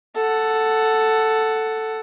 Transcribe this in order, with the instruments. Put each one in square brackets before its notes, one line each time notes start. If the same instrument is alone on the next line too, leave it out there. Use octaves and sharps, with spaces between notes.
[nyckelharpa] A4 F#5